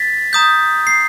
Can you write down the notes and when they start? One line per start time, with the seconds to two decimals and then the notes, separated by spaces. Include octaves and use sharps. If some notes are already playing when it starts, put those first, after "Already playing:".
Already playing: A6 B6
0.33 A#5 D#6 G6
0.87 C7